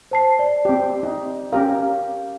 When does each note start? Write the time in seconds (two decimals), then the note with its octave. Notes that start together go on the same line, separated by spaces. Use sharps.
0.11 C5 A5 C7
0.39 D5
0.65 C4 G4
1.03 D#4
1.53 C#4 G4 A#4 F5